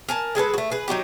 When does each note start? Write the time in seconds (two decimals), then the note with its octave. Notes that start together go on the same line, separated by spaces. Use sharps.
0.09 A#4 G#5 A5
0.35 G#3 G#4 A4 B4
0.54 A3 F#4
0.71 G#4 B4
0.88 F#3 D#4 F#4 G4